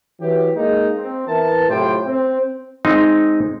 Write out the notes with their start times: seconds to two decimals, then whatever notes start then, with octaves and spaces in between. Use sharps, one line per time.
0.20 E3 F#3 G4
0.55 G#3 A#3 D#4
0.96 C4
1.27 E3 B3 E4 A#4 A5
1.68 A2 C3 F#3 F4 G5 C6
2.06 C4
2.85 G#3 C4 D#4